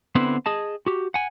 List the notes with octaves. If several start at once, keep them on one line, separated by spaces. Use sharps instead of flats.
D3 B3 C4 E4 B4 C5
G#4 D#5 A5
F#4 G4
F#5 G#5